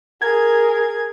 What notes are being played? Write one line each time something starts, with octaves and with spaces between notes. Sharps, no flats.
G#4 A#4 G#6